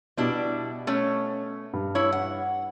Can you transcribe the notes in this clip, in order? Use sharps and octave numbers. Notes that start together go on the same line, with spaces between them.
B2 G3 D4 E4
A3 C#4 C#5
G2
E3 E4 C#5
F#5